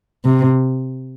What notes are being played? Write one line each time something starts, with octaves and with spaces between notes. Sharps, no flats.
C3